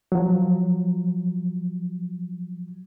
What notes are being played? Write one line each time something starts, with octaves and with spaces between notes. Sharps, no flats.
F3 F#3